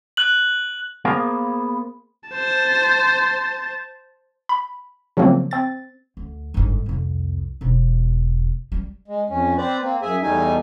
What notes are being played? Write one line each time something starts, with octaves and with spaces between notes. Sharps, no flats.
F#6 F#7
A#3 B3 G#4 A#4 C5 F5
C5 A5
B5
C#3 F3 F#3 A3 A#3 C4
C4 A6
D2
G1 G#2
C2 F2
E1 B2
G3
G#3
F2 C#4
C4 B4 C5 D5
A#3 C4
F#2 G#4 E5 G#5
E2 G3 A3 D#4 G#5